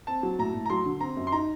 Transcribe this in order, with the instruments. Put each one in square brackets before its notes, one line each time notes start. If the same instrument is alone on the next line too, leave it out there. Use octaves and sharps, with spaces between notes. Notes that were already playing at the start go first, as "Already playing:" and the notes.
[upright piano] C4 [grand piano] A5
[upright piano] F#3
[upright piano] A2 [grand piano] A#5
[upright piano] A2
[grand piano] A#5
[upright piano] F#3 [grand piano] C6
[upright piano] D3
[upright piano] C4 [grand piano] A#5
[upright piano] F#2
[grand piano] C6
[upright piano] D#4 [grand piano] A#5